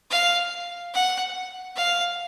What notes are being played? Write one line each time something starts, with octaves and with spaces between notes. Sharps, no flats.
F5
F#5
F5